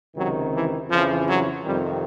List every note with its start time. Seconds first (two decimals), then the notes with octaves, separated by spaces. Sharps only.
0.15 C#2 C3 D#3 F#3
0.51 E3
0.89 F2 C#3 E3 F3
1.26 F#3
1.63 F2 C3 D#3 G3